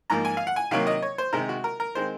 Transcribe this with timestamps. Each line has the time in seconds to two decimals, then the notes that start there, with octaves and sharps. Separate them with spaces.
0.10 G#2 F3 A#3 A#5
0.25 G#5
0.37 F5
0.47 F#5
0.56 G#5
0.71 C3 D#3 F#3 A#3 F5
0.87 D#5
1.02 C#5
1.18 C5
1.33 C3 D#3 G#3 A#4
1.49 F#4
1.64 A#4
1.80 A#4
1.95 D#3 G#3 C4 C5